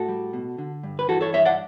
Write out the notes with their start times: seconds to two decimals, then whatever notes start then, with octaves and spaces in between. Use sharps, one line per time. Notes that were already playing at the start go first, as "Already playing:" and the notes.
Already playing: A2 F#4 A4
0.09 G3
0.33 B2
0.58 D3
0.83 G2
0.99 B4
1.08 E3 F#4 A4
1.21 A4 C#5
1.33 G2 C#5 E5
1.45 D5 F#5